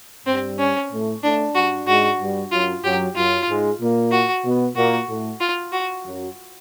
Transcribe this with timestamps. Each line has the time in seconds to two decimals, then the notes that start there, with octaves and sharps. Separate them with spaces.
0.26 G2 G3 C4
0.59 C#4
0.91 A2 A3
1.23 A2 A3 D4
1.55 G2 G3 F#4
1.87 G#2 G#3 F#4
2.20 G2 G3
2.51 F#2 F#3 F4
2.84 F#2 F#3 G4
3.16 F#2 F#3 F4
3.48 G#2 G#3
3.80 A#2 A#3
4.12 F#4
4.45 B2 B3
4.76 A#2 A#3 F#4
5.08 A2 A3
5.41 F4
5.72 F#4
6.05 F#2 F#3